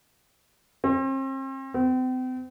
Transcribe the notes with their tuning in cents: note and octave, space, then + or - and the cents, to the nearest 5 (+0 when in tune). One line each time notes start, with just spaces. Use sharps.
C4 +40
C4 -40